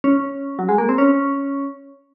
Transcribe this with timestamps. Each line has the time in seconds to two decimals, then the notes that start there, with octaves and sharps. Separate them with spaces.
0.04 C#4
0.59 F#3
0.69 G#3
0.78 A#3
0.89 C4
0.98 C#4